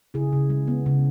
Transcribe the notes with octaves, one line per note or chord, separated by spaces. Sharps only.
C#3 E4 G#4
C#3
G#3
B3
C#3